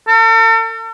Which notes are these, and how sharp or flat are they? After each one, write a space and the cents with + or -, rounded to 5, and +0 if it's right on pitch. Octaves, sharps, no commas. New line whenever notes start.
A4 +45